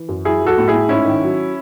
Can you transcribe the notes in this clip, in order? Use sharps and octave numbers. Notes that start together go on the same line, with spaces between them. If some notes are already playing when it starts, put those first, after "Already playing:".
Already playing: E3
F#2
F#3 E4 G#4
F#3
F#4 A4
A2
E4 G#4
A2
G#2 C#4 E4
D#3
F#3